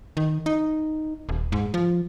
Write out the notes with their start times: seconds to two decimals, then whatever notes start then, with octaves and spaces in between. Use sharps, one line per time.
0.17 D#3
0.46 D#4
1.29 D#1
1.52 G#2
1.74 F3